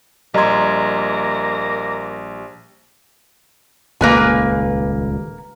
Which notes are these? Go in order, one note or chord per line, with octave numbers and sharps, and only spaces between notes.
A#1 G3 A#3 D#5 A#5 C6 G#6
D#1 C#2 A#3 B4 G#5